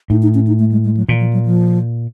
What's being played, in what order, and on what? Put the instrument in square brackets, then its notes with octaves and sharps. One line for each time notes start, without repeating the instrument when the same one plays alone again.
[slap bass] A2 [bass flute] D#4
[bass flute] D#4
C#4
D#4
A3
G#3
G#3
F#3
[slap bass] A#2 [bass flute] E3
[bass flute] F3
F#3
F3